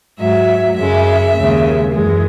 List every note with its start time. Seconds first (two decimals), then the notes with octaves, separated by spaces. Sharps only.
0.20 G#2 F#3 E5
0.77 F#2 C#3 G#3 E5
1.35 D#2 C#3 G#3
1.91 F#2 E3 G#3